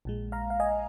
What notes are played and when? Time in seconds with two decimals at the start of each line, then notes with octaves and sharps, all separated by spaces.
0.05 A#1 A#2 G#3
0.32 F5 A#5
0.50 F5
0.60 D#5 G#5